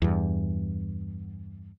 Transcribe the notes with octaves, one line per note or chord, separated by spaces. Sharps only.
E2 G2